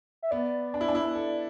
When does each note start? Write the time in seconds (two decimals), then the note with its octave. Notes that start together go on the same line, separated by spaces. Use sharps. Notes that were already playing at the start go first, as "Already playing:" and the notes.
0.23 E5
0.31 B3 D5
0.74 D4
0.81 E4
0.88 D4
0.95 E4
1.02 D4
1.15 A4